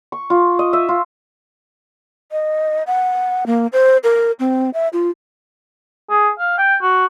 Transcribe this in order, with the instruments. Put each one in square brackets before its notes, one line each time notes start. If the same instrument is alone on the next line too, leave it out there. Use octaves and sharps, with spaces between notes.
[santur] C#6
F4
D#5
E5
F4
[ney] D#5
F#5
A#3
C5
A#4
C4
E5
F4
[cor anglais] G#4
F5
G5
F#4